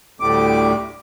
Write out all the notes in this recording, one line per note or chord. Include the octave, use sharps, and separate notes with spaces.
D2 A2 G3 D6